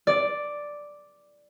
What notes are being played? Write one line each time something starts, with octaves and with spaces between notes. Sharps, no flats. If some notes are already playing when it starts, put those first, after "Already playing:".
D5